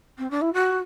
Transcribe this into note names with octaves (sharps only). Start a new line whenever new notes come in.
C4
D4
E4
F#4